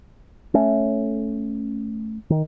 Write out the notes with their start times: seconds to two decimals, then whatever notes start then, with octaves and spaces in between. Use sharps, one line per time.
0.54 A3 C#4
2.30 D#3